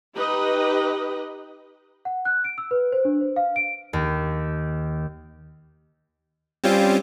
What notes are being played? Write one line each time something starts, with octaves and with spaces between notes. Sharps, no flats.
D#4 G4 B4 D#5
F#5
F#6
D7
E6
B4
C5
D4
C5
F5
D7
D#2
G3 C4 C#4 F4